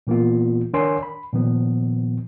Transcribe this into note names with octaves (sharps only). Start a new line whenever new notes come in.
A#2 E3 A#3 B3 F4
D#3 D4 A#4 C#5 G#5 C6
B5
A#2 D#3 F3 B3